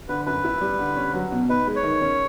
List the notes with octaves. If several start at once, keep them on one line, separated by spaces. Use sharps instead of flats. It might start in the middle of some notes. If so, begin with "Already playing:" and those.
D3 B4
F#2 B4
E4
G3
D3
C#4
F#3
B2
D#4 B4
G#3
C#5
D#3
C#4